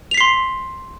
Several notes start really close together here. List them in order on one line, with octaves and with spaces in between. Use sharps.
F7 B6 C7 C6